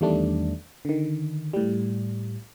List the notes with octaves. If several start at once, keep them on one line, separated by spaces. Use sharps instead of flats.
E2 D#3 G3 A3 D4
D3 D#3
A2 G3